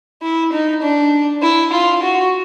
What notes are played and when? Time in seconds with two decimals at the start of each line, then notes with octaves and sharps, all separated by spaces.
0.22 E4
0.52 D#4
0.82 D4
1.42 E4
1.72 F4
2.02 F#4